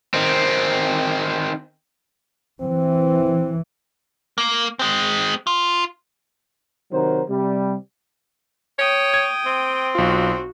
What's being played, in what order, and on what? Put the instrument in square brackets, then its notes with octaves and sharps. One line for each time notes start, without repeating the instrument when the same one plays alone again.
[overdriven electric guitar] D#3 C4
[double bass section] E3 [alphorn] C4
[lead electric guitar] A#3
G#3 C4
F4
[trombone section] C3 D#3 F#3 A#4 C5
C3 G3
[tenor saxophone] C#5 [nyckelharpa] G5 D#6
[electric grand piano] G#6
[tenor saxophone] C4
[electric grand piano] B1 F4 [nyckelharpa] F#4